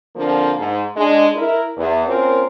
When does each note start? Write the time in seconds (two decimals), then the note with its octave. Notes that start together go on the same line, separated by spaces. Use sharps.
0.16 D3 F3 A#3 C4 D4
0.59 G#2
0.96 G#3 D4
1.35 E4 A#4
1.77 E2
2.07 A#3 C4 C#4 F4 A#4 C5